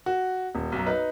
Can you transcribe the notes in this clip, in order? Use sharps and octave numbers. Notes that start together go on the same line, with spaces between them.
F#4
D#1
B1 F#2
D#4 B4